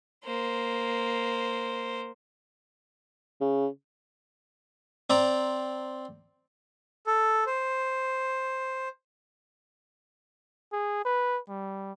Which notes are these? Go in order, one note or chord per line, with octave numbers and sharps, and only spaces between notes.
A#3 C5
C#3
C4 D5 A#5
A4
C5
G#4
B4
G3